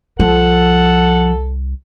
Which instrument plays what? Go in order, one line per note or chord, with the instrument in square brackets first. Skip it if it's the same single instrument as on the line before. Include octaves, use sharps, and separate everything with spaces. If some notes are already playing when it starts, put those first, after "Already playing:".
[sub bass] C2 [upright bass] F3 [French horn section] A4 [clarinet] F#5